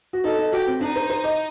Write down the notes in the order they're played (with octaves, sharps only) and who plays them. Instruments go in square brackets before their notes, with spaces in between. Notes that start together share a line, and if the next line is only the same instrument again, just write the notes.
[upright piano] F#4
[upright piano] D#4 [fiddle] A4
[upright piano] D#4
[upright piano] F#4 [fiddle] G4
[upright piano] C4
[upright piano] D4 [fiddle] D#4
[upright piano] C5
C5
D#5